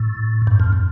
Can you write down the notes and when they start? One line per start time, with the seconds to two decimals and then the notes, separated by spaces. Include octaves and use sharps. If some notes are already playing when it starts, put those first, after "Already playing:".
Already playing: A2
0.47 G2
0.60 F2